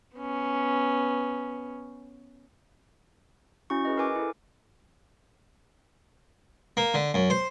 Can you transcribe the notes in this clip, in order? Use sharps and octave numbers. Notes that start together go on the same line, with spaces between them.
B3 C#4
C#4 E4 F#4 C#6
G#4 B4 D#5
A#4 B4 G#5 D6
E4 A4
A#3
D3
F#2
C5